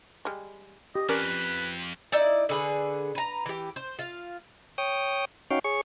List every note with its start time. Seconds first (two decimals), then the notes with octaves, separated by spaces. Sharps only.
0.25 G3 G#3
0.95 G4 D#5
1.09 F2 C#4 A#4 B4 D5
2.12 D#4 E4 D5
2.49 D3 G#4 B4
3.15 B4 A#5
3.46 E3 G4
3.76 C5
3.99 F4 F5
4.78 C#5 G5 D#6
5.51 C#4 D#4 F#4 C#5 F5 G5
5.64 G#4 C#5 C#6